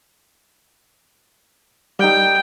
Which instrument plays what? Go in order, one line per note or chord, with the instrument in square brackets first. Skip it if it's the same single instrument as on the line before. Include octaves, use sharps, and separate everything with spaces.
[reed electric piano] G3 D#4 [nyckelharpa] G5